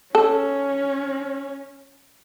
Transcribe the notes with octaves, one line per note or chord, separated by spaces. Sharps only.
C#4 A4